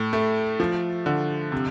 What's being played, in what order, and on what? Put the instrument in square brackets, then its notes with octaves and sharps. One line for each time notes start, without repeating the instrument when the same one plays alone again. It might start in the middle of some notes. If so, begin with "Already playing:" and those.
Already playing: [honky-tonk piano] A2
A3
F3
D3
C3